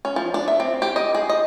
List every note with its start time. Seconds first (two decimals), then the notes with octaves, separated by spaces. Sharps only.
0.05 C#4
0.16 F3
0.34 D4
0.48 E5
0.60 C4
0.82 G4
0.96 D#5
1.15 G#4
1.29 D#5